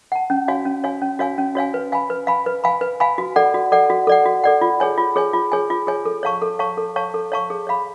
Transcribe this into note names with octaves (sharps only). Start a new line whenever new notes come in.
F#5 A5
C#4
F#4 C#5 F5 G#5
C#4
F#4 C#5 F5 G#5
C#4
F#4 C#5 F5 G#5
C#4
F#4 C#5 F5 G#5
B4
F5 G#5 B5
B4
F5 G#5 B5
B4
F5 G#5 B5
B4
F5 G#5 B5
F#4
A4 D5 F#5
F#4
A4 D5 F#5
F#4
A4 D5 F#5
F#4
A4 D5 F#5
F4
G#4 C#5 G#5
F4
G#4 C#5 G#5
F4
G#4 C#5 G#5
F4
G#4 C#5 G#5
A4
C#5 F5 A5 C#6
A4
C#5 F5 A5 C#6
A4
C#5 F5 A5 C#6
A4
C#5 F5 A5 C#6
G#4
C#5 F5 B5